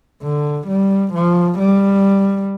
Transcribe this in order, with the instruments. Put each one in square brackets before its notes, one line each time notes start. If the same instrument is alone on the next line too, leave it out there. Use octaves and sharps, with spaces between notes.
[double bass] D3
G3
F3
G3